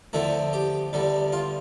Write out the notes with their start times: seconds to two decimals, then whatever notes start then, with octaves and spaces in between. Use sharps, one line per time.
0.13 E2 D3 F3 A3 E4
0.53 G4
0.93 E2 D3 G3
1.32 F4